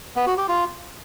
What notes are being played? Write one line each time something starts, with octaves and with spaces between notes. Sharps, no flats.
B3
F#4
G4
F4